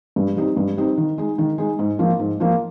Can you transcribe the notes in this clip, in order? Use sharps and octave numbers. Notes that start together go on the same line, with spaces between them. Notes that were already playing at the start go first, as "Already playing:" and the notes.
G2
G3 C4 D#4
G2
G3 C4 D#4
D#3
G#3 D#4
D#3
G#3 D#4
G#2
F3 A#3
G#2
F3 A#3